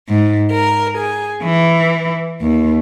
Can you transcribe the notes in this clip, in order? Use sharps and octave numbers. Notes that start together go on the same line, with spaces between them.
G#2
A#4
G#4
E3
D#2